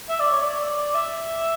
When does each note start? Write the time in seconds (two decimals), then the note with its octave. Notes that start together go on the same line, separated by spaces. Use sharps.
0.09 E5
0.20 D5
0.31 C#5
0.42 D5
0.95 E5